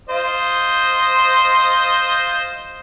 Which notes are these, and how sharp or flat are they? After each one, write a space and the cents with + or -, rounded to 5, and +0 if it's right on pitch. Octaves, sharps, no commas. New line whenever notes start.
F4 -5 C5 +0 D#5 +0